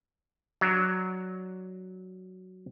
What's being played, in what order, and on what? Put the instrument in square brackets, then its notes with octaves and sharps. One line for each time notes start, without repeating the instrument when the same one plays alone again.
[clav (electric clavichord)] F#3 D4